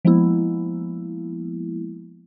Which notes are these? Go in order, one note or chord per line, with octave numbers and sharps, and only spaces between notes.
F3 G#3 A#3 B3 E4